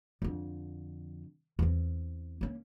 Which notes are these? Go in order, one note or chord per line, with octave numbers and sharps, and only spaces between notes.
F2 D3
E2 C4
A#3 C#4